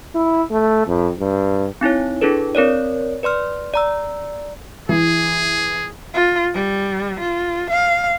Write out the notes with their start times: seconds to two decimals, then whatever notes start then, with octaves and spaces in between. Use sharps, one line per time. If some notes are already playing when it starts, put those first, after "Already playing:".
0.15 E4
0.51 A3
0.87 F2
1.19 G2
1.81 C4 D#4 E4 C#5
2.21 D4 E4 G#4 A4 B4
2.55 C4 A#4 C#5 D5
3.23 B4 D5 C6 F6
3.74 D5 A#5 E6
4.89 E3 G#4
6.13 F4
6.54 G3
7.20 F4
7.70 F5